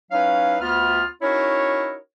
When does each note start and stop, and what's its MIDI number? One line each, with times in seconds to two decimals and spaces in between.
0.11 0.57 54
0.11 0.57 61
0.11 0.57 63
0.11 0.57 64
0.11 0.57 71
0.11 0.57 77
0.61 1.05 38
0.61 1.05 59
0.61 1.05 65
0.61 1.05 89
1.22 1.96 61
1.22 1.96 63
1.22 1.96 64
1.22 1.96 66
1.22 1.96 70
1.22 1.96 73